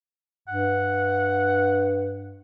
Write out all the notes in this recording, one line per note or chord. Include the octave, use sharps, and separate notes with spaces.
G2 F#5